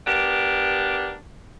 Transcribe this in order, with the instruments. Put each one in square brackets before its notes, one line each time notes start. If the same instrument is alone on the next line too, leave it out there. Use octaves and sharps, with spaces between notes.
[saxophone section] B3 D4 G4 A#4